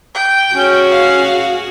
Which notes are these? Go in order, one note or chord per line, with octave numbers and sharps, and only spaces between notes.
G5
C#4 F#4 G#4
F5